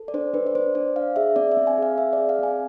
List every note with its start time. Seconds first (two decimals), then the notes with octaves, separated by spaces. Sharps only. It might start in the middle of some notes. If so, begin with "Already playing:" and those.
Already playing: A4
0.08 D5
0.14 D4 C5
0.34 D4 B4
0.46 D5
0.55 D4 C5
0.75 D4 D5
0.96 D4 F5
1.16 G#4 E5
1.36 C4 D5
1.51 E5
1.57 C4
1.67 G#5
1.78 G#4 F5
1.97 C4 E5
2.13 G#4 D5
2.29 F5
2.39 C4 G#5